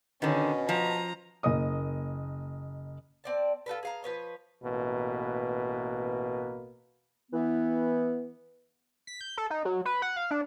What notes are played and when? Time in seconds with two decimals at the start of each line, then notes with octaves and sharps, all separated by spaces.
0.22 B2 D3 D#3 C#4
0.69 F3 A#5
1.43 F#1 A#3 D#5 D#6
3.24 C4 D5 A5
3.66 F4 F#4 A4 B4
3.83 G#4 F5 A#5
4.03 F3 B4 C#5 D#5
4.63 A1 B2 A#3 B4
7.32 E3 B3
9.07 B6
9.21 G6
9.38 A4
9.50 D#4
9.65 F#3
9.85 B4
10.02 F#5
10.16 F5
10.31 D4